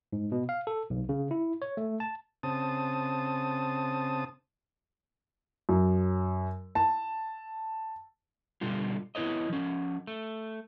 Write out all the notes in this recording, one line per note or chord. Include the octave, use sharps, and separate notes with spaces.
G#2
B2
F5
A4
B1
C#3
E4
C#5
A3
A5
C#3 C4 A5 D#6
F#2
A5
B2 D3 G3 F4
B3 E4 B4 C#5 D#5
F3 C#4
A3